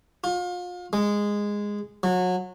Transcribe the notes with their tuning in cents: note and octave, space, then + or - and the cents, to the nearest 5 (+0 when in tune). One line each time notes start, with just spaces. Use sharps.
F4 +35
G#3 -10
F#3 -25